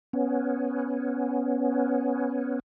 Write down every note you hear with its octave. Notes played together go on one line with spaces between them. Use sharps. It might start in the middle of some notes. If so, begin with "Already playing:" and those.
B3 C#4